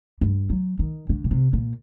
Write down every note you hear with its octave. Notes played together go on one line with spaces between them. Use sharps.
G2
F#3
D#3
D3
A#2
C3
A#2